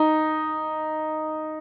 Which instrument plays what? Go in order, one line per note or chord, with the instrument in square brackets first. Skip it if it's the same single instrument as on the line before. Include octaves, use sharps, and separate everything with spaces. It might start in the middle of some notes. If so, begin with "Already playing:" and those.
Already playing: [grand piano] D#4